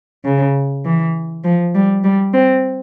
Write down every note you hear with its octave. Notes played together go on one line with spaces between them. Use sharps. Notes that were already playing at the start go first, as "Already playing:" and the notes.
C#3
E3
F3
G3
G3
C4